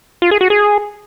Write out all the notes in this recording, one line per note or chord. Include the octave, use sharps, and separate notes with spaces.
F4
G#4
F#4
G#4